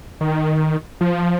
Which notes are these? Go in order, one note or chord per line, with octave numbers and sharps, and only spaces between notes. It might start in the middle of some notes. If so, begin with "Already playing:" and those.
D#3
F3